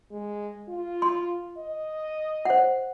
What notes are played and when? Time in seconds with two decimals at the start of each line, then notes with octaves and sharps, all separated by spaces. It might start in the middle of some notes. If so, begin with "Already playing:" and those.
0.12 G#3
0.69 F4
1.02 C6
1.57 D#5
2.45 C5 F#5